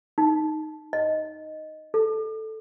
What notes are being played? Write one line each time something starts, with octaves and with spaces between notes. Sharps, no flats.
D#4
D#5
A4